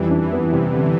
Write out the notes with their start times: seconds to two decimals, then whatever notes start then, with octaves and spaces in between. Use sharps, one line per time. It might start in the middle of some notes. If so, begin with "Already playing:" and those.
Already playing: F2 E3 G3
0.11 D4
0.22 E3
0.32 B3
0.52 C3 G3
0.73 D3